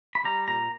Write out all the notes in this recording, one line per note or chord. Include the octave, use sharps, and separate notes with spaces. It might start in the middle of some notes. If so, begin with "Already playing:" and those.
B5
G3 A#5
A#2 A#5